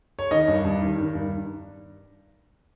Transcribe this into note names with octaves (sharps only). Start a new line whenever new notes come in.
C#5
D#3 D#5
G2
G2
D#3
D#3
G2